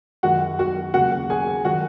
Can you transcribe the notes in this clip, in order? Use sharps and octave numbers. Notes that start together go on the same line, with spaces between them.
F#2 D#3 G#3 F#4 F#5
F#4 F#5
D#2 C#3 F#3 F#4 F#5
G#4 G#5
D#3 F#3 F#4 F#5